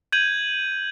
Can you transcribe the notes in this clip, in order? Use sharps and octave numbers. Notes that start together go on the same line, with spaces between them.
G6 G#6 D#7 F#7